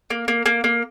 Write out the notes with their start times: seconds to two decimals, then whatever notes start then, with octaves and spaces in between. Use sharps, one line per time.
0.10 A#3
0.28 A#3
0.46 A#3
0.64 A#3